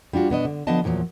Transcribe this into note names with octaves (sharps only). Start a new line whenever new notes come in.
G3 D4 F4 F#4
B2 B3 D4 D#5
D3
D3 F3 B3 D4 D#5 A5
E2 A#2 F3 F#3